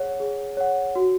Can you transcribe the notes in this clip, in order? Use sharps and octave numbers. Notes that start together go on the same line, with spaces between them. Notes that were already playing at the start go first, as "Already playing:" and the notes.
Already playing: G#4 C#5 F#5
G#4
C#5 F#5
F#4